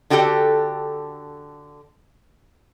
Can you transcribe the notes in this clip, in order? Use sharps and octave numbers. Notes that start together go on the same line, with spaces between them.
D3 F#4 G4 A4 F5 G5